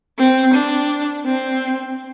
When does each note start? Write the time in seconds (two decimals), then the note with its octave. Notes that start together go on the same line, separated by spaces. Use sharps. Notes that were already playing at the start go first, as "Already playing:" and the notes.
0.19 C4
0.54 D4
1.26 C4